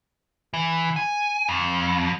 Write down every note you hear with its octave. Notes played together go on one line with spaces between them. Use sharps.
E3
G#5
F2